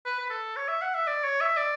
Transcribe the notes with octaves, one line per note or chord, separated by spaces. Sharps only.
B4
B4
A4
C#5
E5
F#5
E5
D5
C#5
E5
D5